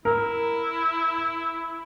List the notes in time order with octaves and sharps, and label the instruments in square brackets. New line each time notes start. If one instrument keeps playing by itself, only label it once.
[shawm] E4 [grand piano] A#4